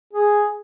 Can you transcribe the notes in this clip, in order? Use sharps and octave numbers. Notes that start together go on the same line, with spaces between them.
G#4